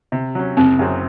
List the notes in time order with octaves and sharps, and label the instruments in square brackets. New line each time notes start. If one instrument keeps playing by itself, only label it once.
[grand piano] C3
F#3 C#4
[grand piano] F#1 [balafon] C4
[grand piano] F#2 C#3 F#3 C4